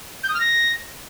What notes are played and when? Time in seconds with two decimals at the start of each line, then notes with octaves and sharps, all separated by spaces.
0.23 G6
0.29 D#6
0.35 F6
0.40 A#6